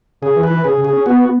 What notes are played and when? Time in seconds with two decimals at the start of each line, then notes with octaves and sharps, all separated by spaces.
0.22 C#3 G#4
0.36 E3
0.43 B4
0.50 E3
0.64 C#3 G#4
0.78 C#3
0.85 G#4
0.93 C#4
1.06 B3 F#4